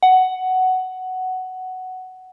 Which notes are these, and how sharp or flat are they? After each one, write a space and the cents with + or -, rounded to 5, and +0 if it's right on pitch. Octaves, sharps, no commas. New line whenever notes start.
F#5 +10